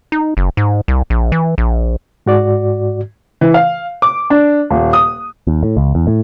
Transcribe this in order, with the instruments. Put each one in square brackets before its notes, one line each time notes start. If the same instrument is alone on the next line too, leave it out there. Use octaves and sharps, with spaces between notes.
[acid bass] D#4
F#1
G#2
C2
A#1
E3
A#1
[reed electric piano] G#2 F#4 D5
[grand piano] E3
F5
D6
D4
D#1
D#6
[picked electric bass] D#2
A2
C#2
E2
A2